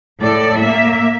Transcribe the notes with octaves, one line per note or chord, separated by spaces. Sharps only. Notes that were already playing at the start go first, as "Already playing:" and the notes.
A2 A4 D5
A#3 E5